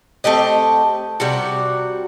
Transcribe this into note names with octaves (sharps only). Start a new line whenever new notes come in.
A3 C4 G4 D#5
C3 G3 F#4